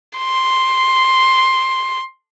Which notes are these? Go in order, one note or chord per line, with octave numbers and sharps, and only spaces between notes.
C6